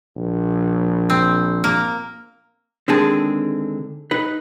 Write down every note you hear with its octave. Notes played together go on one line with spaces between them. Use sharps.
A#1
C4
A#3
D3 D#3 G#3 C4 G#4 A5
D#4 B4